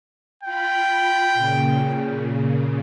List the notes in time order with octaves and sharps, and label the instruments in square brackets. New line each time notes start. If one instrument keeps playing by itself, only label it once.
[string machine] F4 B5 [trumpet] G5
[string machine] A#2 C#3